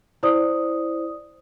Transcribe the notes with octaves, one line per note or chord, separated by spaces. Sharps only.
E4 C5 D5 D#6